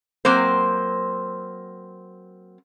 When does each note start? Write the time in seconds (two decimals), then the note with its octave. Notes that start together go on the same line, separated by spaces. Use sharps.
0.25 F#3 A#3 C4 C5